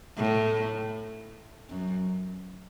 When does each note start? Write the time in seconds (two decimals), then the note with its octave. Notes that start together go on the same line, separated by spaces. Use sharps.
0.17 A2
1.69 F#2